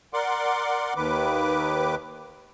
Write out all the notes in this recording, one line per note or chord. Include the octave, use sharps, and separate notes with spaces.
A#4 D5 F#5 C6 D6
D#2 D#3 B4 D6